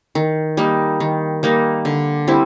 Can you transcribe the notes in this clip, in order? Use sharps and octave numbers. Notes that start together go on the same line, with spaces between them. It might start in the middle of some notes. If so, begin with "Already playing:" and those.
D#3
G3 A#3 D#4
D#3
G3 A#3 D#4
D3
G3 C4 E4